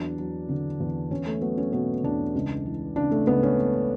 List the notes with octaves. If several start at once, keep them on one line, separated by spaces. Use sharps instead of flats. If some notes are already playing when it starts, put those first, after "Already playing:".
Already playing: E2 F#3 D4
F#3
D3
E2
E2 C#4
A3
F#3 B3
C#4
B2 B3
E2 D4
C#2
E3
C#3 D4
A3
C#2 B3
C#4